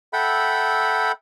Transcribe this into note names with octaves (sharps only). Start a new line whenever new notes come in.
A4 E5 F#5 G5 B5